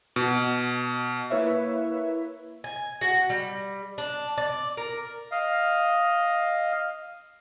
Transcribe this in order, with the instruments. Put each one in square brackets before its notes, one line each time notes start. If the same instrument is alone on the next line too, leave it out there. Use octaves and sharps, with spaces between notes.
[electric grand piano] B2
[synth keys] A#3 E4 B4 C#5 E5
[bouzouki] G#5
F#4
G3
D4
D5
A#4
[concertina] D#5 F5